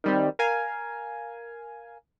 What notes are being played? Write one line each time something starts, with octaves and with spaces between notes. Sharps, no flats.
D#3 G3 C4
A#4 F5 G#5